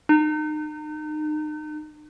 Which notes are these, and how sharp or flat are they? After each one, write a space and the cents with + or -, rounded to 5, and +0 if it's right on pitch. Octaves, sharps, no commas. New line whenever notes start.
D#4 -35